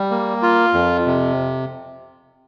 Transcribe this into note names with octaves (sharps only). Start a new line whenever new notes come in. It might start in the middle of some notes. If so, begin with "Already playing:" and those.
Already playing: G3
A#3
F4
F2
C3